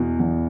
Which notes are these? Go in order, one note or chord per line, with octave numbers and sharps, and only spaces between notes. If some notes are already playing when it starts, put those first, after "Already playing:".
Already playing: E2 B2
E2